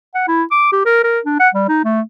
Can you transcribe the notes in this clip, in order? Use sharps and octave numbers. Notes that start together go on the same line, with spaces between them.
F#5
E4
D6
G4
A#4
A#4
D4
F#5
G3
D#4
A3